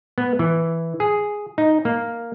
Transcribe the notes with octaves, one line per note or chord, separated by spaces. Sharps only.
B3
E3
G#4
D#4
A#3